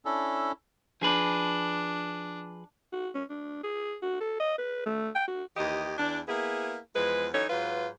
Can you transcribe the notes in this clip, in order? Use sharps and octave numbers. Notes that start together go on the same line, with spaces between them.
C#4 D4 E4 A4
F3 D4 G#4 B4
F#4
C#4
D4
G#4
F#4
A4
D#5
B4
A3
G5
F#4
D#2 E3 G4 D#5
E2 D4
A#3 B3 E4 G#4
E2 F3 G#3 B4
E3 F#3 D#4 A4 C#5
G#2 F#3 F4 B4